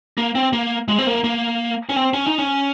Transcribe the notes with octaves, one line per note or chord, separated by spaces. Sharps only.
A#3
C4
A#3
G#3
C4
A#3
A#3
C#4
C4
C#4
D#4
C#4